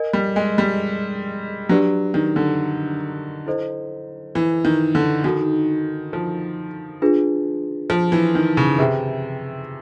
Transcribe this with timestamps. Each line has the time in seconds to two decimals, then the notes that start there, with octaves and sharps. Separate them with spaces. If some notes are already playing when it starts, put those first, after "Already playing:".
Already playing: A#4 D#5 G#5
0.13 G3
0.36 G#3
0.58 G3
1.69 F#3 D4 G4 B4 D5
2.14 D#3
2.36 D3
3.46 E4 A4 C5 D#5
4.35 E3
4.65 D#3
4.95 D3
5.24 D#3 D#4 F#4 A4
6.13 F3
7.02 D4 F4 G#4 B4
7.90 F3
8.12 E3
8.35 D#3
8.57 C#3
8.79 C3 G#4 B4 E5 G5